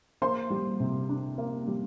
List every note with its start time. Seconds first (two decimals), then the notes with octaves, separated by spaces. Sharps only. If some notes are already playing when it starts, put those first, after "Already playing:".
0.22 A#3 C5 C6
0.50 G3
0.80 C3
1.09 D4
1.38 A#3
1.67 G3